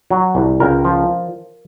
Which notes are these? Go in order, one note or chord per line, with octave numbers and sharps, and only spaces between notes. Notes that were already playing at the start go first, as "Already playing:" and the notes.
F#3
C2
C#2 A#4
F3